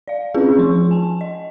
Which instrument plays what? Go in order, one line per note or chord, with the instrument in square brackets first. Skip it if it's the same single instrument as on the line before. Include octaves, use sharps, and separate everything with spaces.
[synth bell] D5 F5
C4 C#4 F4 G#4 B4
F3 C6 C#6
G#5 A5
D#5